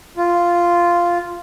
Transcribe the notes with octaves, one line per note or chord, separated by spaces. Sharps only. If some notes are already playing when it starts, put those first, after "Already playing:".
F4